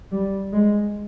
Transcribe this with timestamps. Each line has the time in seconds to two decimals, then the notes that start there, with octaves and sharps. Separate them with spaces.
0.12 G3
0.53 G#3